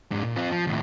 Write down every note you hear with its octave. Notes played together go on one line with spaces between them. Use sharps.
G#2 D4
A#2
C4 F4
F3
D#2 A2